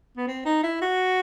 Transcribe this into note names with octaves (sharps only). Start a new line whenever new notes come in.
B3
C4
D#4
E4
F#4